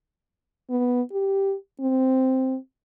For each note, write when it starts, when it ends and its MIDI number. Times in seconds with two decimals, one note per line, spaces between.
0.70 1.02 59
1.12 1.54 67
1.80 2.57 60